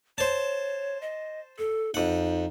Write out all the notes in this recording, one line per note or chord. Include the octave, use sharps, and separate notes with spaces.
C5 C#5 A5
D#5
A4
F2 D#4 F#5